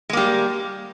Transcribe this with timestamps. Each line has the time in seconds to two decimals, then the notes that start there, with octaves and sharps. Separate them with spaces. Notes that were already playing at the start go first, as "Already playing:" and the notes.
0.09 G#3
0.13 A#3
0.17 G3